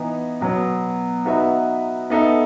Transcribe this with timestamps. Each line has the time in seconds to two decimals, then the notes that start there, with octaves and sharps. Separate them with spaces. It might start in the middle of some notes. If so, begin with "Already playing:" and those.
Already playing: E3 B3 D#4
0.41 B2 F#3 B3
1.25 B3 D#4 F#4 B4 E5
2.10 B3 D#4 A4 E5